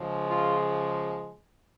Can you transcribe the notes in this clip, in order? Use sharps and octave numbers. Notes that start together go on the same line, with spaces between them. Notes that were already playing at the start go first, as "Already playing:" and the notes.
Already playing: C#3 F3 G#3
F4